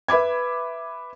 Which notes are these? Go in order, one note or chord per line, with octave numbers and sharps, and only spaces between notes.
B4 E5 B5 D6 G#6